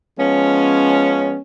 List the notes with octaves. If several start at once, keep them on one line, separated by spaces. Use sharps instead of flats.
F3 G#3 B3 C#4